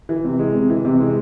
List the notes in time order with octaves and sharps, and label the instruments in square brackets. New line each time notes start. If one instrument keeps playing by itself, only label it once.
[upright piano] E3
C3
G#3
C3
E3
C3
G#3